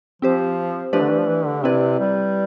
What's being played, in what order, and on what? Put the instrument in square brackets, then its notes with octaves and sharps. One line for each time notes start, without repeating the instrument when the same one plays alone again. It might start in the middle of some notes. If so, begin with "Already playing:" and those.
[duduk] F3 [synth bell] C4 G4 C5
[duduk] F3 [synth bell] A3 D4 G4 B4 D5
[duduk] D3
E3
F3
E3
D3
[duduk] C3 [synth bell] C4 E4 B4 D5
[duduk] G3